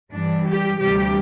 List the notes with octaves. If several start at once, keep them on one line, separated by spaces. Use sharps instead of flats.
G2 E3 G3 D4
G4
D2 C3 E3 G3 G4